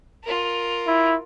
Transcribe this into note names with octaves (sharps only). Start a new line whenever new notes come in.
F4 A#4
E4